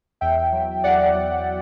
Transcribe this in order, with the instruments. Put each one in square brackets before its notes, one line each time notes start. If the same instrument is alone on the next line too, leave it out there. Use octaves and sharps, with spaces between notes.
[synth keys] E2 E5 G5
F#3
E2 D5 F#5
F#3